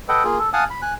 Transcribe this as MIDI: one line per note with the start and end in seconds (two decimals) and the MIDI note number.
0.09 0.23 69
0.09 0.23 71
0.09 0.23 75
0.09 0.23 78
0.09 0.23 79
0.24 0.38 58
0.24 0.38 65
0.24 0.38 68
0.39 0.49 69
0.53 0.64 77
0.53 0.64 78
0.53 0.64 80
0.53 0.64 81
0.53 0.64 87
0.70 0.81 83
0.82 0.94 80
0.82 0.94 90